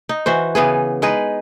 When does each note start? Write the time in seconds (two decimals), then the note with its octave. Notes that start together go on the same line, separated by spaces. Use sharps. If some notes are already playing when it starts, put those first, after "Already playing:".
0.09 D#4
0.26 E3 F#4 C5
0.55 C#3 E3 B3 G#4
1.02 G#3 D#4 G#4 B4